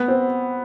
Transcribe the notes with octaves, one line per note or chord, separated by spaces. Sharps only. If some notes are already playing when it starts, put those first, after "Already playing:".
Already playing: B3
C4